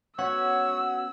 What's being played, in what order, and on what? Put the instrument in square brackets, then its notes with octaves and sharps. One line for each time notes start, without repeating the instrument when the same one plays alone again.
[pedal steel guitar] B3 C#4 F#4 [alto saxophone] C#5 [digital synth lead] F#5 [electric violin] E6